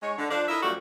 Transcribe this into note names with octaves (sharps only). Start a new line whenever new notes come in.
G#3 D#4 C#5
D3
F3 D4
E4 A4 A#4 D#5 E5
F#2 F3 G3 A3 F#4